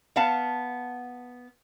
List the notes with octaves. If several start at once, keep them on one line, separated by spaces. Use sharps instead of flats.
B3 F5 F#5 A5